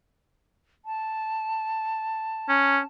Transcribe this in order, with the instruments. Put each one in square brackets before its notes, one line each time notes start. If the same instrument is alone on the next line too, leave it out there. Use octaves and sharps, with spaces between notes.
[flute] A5
[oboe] C#4